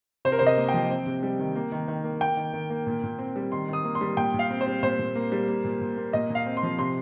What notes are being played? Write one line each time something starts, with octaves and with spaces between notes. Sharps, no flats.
C3 C5
A#4
C3 C5
D#5
A#3
G5
F3
C4
C3
G3
D#3
A#3
D#3
D#3
A#3
A#3 G5
D#3
D#3
A#3
A#2
A#2
C4
G3
D#3 C6
D#3
D#6
A#3
C6
G3
A#2 G5
A#2
F5
C4
C5
G3
A#2 C5
A#2
A#3
G3
A#3
A#2
A#2
A#3
A#2 D#5
A#2
F5
C4
C6
F3
C3 C6